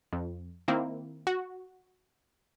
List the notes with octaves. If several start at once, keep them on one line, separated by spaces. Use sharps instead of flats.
F2
D#3 A#3 C4 E4
F#4